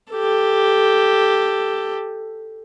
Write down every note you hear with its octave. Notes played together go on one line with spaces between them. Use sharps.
G4 A4